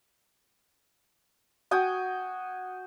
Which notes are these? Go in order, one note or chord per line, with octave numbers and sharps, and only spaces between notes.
F#4 G5 G#5 D#6